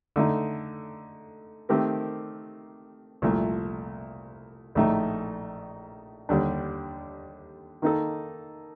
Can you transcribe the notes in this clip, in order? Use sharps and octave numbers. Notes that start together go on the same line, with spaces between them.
D3 A3 D#4
D#3 A3 C4 G4 A#4
C2 A#2 F3 A3
A#1 A2 A3 D#4
D#2 D3 G3 D4
D#3 A#3 D#4 A4